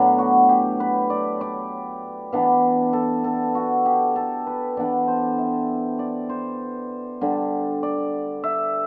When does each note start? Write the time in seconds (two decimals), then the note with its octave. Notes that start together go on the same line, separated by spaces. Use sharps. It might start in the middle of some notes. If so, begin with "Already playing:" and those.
Already playing: A2 F#3 B3 D4
0.19 F#4
0.49 G4
0.80 B4
1.10 D5
1.41 D5
2.32 E3 B3 D4
2.93 A4
3.24 A4
3.55 F#4
3.86 G4
4.16 A4
4.47 B4
4.77 E3 B3 D4 D5
5.08 C5
5.38 E5
5.99 D5
6.29 C5
7.21 D3 G3 D4
7.83 D5
8.44 E5